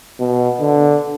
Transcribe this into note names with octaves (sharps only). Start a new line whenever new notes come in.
B2
D3